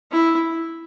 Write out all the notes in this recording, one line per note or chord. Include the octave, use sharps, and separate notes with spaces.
E4